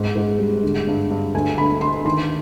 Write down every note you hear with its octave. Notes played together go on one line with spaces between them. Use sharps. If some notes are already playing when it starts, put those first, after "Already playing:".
Already playing: G#2
G#2
G3
D3
G2
G2
D2 G#5
D2 B5
D2 C6
D#3 C6